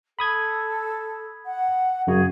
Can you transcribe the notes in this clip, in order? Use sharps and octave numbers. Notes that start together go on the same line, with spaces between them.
A4 B5 D#6 G#6
F#5
F#2 C#3 F#4 G#4